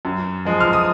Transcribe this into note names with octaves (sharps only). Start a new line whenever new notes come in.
F#2
F3 G#3
F6
D#6